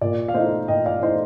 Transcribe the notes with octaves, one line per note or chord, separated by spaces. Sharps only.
A#2 D5
F5
A3 D#4 C5 D#5
A#2 D#5 G5
D5 F5
A3 D#4 C5 D#5